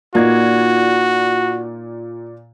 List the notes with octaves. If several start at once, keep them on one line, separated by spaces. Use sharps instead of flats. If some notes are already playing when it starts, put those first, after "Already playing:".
A#2 A#3 D#4 F#4 G#6